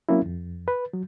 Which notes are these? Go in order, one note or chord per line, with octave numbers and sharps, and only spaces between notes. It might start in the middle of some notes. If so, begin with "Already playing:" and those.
F#3 A#3 C4 C#4 E4
F2
B4
F#3